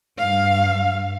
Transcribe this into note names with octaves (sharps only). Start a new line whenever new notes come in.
G2 F5